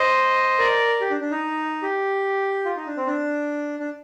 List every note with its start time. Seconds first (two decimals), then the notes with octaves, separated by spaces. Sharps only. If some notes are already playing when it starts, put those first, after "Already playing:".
Already playing: C5 D#5
0.59 A#4 D5
1.01 G4
1.10 D4
1.21 D4
1.31 D#4
1.82 G4
2.65 F4
2.76 D#4
2.87 D4
2.97 C4
3.07 D4
3.80 D4